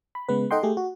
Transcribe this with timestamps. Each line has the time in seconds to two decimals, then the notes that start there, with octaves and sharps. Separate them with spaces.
0.15 B5
0.29 C#3 G#3 B3 B4
0.51 D#4 A4 D#5 F#5 G5 C6
0.63 A3 G4 G#4
0.77 F#4